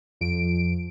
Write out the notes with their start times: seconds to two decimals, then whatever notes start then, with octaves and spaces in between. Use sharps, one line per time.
0.21 F2 D7